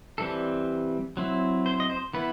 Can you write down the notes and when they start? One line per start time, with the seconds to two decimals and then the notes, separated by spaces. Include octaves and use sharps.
0.18 E3 G3 C4 A4
1.17 F#3 C4 E4
1.66 C5
1.80 D#5
1.90 C5
2.13 E3 B3 E4 B4